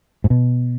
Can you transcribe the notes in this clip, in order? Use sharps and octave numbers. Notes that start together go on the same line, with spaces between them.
G#2
B2